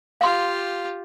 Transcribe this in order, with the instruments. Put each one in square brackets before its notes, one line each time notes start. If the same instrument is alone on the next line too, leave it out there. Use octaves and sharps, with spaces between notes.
[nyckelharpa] F4 G4 [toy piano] F5 C6